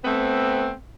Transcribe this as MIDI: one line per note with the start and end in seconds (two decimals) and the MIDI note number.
0.04 0.72 57
0.04 0.72 59
0.04 0.72 60